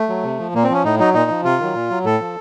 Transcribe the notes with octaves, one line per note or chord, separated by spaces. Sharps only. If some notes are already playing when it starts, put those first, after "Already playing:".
Already playing: A3
F#3
C3
F3
A#2 A#3
C4
F3 C#4
A2 D#4
F#3 D#4
A#2 D#4
F3
C3 F4
D#3 F#3
A#2
F#3
A2 A4
F3